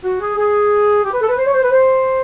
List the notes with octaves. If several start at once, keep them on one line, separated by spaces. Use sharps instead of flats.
F#4
G#4
G#4
G4
B4
A4
B4
C5
C#5
C5
B4
C5